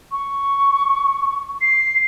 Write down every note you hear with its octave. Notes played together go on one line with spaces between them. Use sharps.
C#6
C7